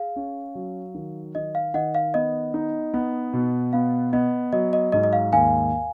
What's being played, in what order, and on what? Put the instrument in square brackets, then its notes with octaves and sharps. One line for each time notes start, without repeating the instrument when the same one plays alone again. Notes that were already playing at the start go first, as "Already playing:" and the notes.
Already playing: [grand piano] G#4 [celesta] F5
[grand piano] C#4
F#3
D#3
[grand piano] D#3 [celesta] D#5
[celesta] F5
[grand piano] D#3 [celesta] D#5 F#5
[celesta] F5
[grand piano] B3 [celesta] D#5
[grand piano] D#4
B3
B2
[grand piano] B3 [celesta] F5
[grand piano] B3 [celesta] D#5
[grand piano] F#3 [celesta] D#5
[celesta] D#5
[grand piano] G#2 [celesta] D#5
[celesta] D#5
F5
[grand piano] D#2 [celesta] F5 G#5